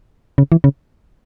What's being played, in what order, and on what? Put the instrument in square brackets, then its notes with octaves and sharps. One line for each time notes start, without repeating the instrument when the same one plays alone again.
[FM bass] C#3
E3
C#3